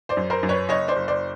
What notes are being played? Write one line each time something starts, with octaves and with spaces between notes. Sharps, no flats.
C5 D5
F#2
A#4 C5
F#2
B4 C#5
F#1 C#5 D#5
C5 D5
F#1
C5 D5